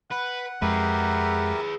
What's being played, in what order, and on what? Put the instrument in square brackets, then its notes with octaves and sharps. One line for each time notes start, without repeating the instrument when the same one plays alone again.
[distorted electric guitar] B4 [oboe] F#5
[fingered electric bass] F2 G#3 [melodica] G4 A#4 E5 [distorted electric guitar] G#4 B4